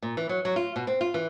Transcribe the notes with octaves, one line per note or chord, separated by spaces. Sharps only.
A#2
E3
F#3
F#3
F4
B2
C4
F4
E3